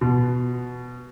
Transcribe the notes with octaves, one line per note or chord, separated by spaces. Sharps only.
B2